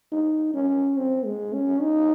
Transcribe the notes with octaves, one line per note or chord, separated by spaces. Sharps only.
D#4
C#4
C4
G#3
C#4
D#4